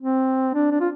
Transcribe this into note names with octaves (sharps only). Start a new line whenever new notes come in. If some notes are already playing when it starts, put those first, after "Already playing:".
C4
D4
D4
F4